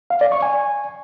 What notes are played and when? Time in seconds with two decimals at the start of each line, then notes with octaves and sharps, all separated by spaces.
0.10 F5
0.21 D5
0.32 C#6
0.42 G#5